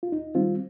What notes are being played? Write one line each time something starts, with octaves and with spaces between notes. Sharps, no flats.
F4
D#2 D#4
D#3 G3 C4 F4